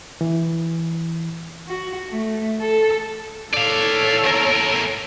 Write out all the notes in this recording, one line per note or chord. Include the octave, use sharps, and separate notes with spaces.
E3
F#4
A3
A4
A4 C#5 D5 F5
E2 A#4